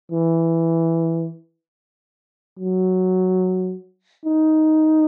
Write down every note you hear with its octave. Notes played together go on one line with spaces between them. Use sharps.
E3
F#3
D#4